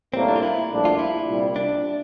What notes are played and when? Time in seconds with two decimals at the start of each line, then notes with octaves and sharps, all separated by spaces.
0.14 A2 G3 A#3 C4
0.28 D4
0.36 F4
0.43 E4
0.71 A#1 A2 G3 D4
0.85 F4
0.99 E4
1.28 C2 A#2 G3
1.56 D4